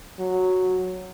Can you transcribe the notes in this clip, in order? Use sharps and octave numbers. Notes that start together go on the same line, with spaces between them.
F#3